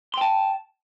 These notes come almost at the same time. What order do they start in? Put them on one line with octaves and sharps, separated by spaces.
C6 G5 A5